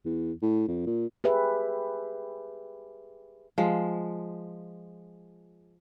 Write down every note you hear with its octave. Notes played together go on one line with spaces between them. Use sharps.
E2
A2
F2
A#2
G4 G#4 B4 E5
F3 G#3